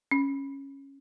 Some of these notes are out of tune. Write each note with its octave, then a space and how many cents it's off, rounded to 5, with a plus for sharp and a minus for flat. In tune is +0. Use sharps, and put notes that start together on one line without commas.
C#4 -10